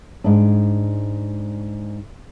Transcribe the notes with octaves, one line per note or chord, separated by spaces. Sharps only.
G#2 D4